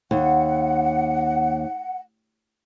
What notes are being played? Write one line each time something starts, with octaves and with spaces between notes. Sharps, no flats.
D#2 F#5